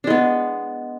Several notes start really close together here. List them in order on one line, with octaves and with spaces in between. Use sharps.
D4 G#3 B3